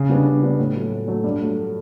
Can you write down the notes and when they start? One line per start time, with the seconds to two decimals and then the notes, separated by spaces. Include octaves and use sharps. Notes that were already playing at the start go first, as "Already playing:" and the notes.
Already playing: C#3
0.10 G3 B3 D4
0.26 C#3
0.42 G3 B3 D4
0.58 A2
0.75 F#3 A3
0.91 A2
1.08 F#3 A3
1.24 G2
1.41 F#3 A3